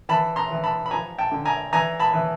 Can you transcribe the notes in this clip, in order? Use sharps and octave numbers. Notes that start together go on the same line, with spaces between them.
E3 A5 B5
A#5 C6
E3
A5 B5
B5
F3 G#5 A#5
G5 A5
D3
G#5 A#5
E3 G#5 A#5
A5 B5
E3